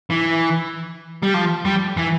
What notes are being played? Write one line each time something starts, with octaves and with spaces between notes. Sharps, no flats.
E3
G3
F3
G3
E3